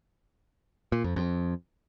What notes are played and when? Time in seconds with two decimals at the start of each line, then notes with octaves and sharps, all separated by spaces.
0.92 A#2
1.04 F2
1.16 F2